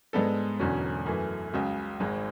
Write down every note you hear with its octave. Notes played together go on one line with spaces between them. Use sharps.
G#2 G#3 B3 D4 A4
E1 E2 D3 F#3 C#4
F#2 E3 A3
C#2 C#3 F#3
G#1 G#2 G#3